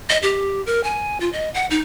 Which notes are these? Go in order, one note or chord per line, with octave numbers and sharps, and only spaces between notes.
D#5
G4
A#4
G#5
F4
D#5
F#5
D#4